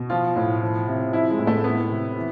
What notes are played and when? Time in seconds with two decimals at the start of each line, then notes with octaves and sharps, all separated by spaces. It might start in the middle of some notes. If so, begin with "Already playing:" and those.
Already playing: B2
0.10 F3 F4
0.36 A2
0.61 F3
0.88 C3
1.13 F3 E4
1.31 G#3
1.39 A2
1.47 A3
1.64 E3 B3
1.90 C3
2.15 E3